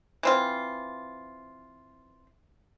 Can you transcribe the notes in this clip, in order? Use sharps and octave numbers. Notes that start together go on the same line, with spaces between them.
E3 C4 F4